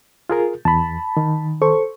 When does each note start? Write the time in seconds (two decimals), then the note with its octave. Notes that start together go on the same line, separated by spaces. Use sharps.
0.30 F4 G#4 A#4
0.65 E2 A5 B5
1.17 D#3
1.62 A4 C5 C#6